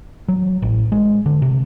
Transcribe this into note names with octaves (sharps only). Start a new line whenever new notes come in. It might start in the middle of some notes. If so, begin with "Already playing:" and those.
F#3
A1
G#3
D3
C3